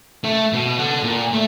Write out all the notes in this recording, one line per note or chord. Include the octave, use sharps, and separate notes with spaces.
A3
B2
A4 F#5
A#2
A3